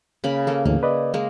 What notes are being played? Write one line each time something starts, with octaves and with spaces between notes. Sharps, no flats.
C#3 A#3 B5
A#3 A4
D2 G#2 E3 A#3
B4 D5 D#5
G#3 A#3